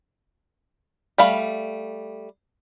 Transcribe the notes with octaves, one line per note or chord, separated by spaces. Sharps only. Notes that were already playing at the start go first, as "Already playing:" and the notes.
G3 A3 F5 B5